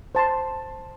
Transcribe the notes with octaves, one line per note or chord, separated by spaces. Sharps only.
C5 A5 C6